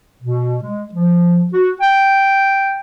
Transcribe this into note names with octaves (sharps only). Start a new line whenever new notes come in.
B2
G#3
F3
F#4
G5